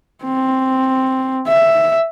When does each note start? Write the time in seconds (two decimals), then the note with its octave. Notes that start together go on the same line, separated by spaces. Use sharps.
0.24 C4
1.48 E5